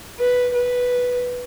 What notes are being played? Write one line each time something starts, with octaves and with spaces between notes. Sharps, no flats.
B4
B4